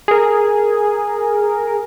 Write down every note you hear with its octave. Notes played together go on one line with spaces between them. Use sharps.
G#4 A#4